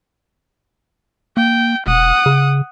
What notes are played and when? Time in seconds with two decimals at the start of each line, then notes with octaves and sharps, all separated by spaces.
1.37 A#3 G5
1.87 E1 F#5 D#6
2.26 C#3